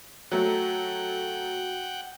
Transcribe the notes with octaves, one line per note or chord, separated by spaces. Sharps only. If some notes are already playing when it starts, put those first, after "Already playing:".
F#3 A3 F#4 F#5 G5